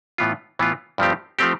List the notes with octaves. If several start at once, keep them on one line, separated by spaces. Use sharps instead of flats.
A2 E3 B3 F4
A2 E3 B3 F4
G2 F3 A3 C4 G4
F3 A3 C4 G4